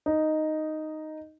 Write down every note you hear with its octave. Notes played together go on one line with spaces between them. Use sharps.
D#4